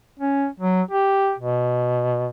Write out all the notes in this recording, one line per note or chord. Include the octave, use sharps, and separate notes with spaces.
C#4
F#3
G4
B2